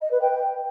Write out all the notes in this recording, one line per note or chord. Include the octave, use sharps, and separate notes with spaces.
D#5
B4
G5